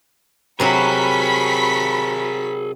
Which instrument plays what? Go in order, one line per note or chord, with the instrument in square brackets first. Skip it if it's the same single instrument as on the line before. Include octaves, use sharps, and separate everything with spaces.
[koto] C3 F#3 F#4 [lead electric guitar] G#4 A#4 [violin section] B5 C#6 B6